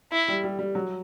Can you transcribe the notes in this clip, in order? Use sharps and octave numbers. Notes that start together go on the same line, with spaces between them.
E4
G3
G3
G3
F#3